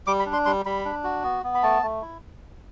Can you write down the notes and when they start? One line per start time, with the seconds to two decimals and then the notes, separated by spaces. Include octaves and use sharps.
0.07 G3 D6
0.19 B5
0.26 D4
0.33 C6
0.46 G3 C6
0.66 G3 B5
0.85 D4
1.04 F#4
1.24 B3
1.44 B3
1.55 B5
1.63 A3 A5
1.82 A3
2.02 E4